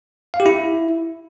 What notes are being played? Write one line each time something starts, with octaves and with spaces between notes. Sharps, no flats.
F5
G4
E4